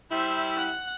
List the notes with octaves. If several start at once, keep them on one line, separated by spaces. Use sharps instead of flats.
G3 E4 C5 E5
F#5